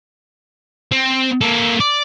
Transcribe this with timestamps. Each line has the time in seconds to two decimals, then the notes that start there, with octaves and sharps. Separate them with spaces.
0.92 C4
1.41 A#3 A4
1.80 D5